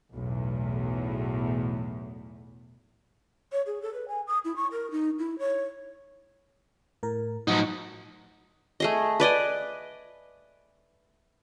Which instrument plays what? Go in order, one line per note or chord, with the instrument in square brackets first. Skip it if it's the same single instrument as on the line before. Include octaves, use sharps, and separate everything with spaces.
[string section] B1 E2 A2
[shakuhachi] C#5
G#4
A4
B4
G#5
D#6
E4
C#6
A#4
D#4
E4
C#5
[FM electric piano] A2 A#4
[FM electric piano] A2 F3 F#5 [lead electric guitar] F#3 D#4
[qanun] A3 G#4 D#5
B4 D5 D#5 G#5